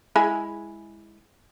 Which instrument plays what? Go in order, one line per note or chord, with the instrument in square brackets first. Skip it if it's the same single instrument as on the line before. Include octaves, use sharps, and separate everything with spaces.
[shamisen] G#3 E4 G#4